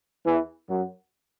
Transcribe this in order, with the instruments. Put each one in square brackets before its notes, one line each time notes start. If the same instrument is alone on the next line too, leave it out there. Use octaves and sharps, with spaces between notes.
[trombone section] E2 E3
F#2 F#3